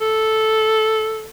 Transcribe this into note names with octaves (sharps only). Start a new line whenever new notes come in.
A4